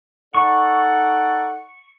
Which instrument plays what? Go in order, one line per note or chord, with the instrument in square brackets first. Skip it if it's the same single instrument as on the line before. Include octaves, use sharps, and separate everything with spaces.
[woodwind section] D#4 A4 D5 [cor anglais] F#5 [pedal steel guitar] C#6